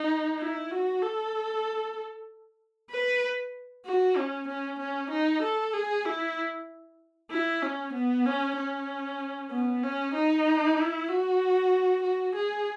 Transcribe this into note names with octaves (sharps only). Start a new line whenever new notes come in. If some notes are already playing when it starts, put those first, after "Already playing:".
Already playing: D#4
E4
F#4
A4
B4
F#4
C#4
C#4
C#4
D#4
A4
G#4
E4
E4
C#4
B3
C#4
C#4
B3
C#4
D#4
E4
F#4
F#4
G#4